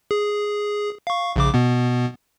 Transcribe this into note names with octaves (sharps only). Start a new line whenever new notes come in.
G#4
F5 C#6
A#1 C#3 D6
B2 B3